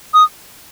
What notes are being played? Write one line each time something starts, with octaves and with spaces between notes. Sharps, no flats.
D#6